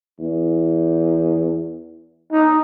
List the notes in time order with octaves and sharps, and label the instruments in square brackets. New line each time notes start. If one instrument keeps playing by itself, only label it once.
[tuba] E2
[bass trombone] D#4